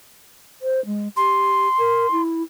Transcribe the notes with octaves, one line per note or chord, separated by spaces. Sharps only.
C5
G#3
G4 C6
A#4
E4